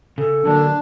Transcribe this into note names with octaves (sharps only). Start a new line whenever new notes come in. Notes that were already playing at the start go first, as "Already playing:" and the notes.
C#3 A4
D3 F#3 A#3 D4